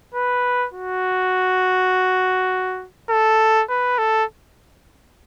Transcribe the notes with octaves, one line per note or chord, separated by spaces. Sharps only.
B4
F#4
A4
B4
A4